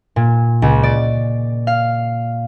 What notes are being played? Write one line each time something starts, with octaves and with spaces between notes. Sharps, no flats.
A#2
C#2
D5
F5